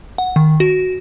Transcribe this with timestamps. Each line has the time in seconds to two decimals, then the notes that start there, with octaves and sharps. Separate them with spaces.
0.18 F#5
0.36 D#3
0.60 F#4